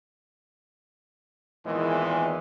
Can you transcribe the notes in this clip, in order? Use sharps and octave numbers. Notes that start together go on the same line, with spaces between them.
G#1 E2 A#2 D#3 E3 G#3